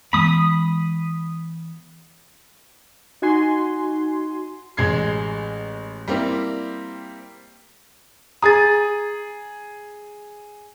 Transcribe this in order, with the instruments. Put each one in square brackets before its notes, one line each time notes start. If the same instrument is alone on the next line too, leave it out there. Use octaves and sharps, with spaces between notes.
[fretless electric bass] E3 G#3 B3 [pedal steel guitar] B5 D#6
[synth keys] D#4 F#4 G#5 C6
[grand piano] A1 G#3 G#6 C7
G3 A#3 C4 E4
[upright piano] G#4 D#6 [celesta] A#5 A6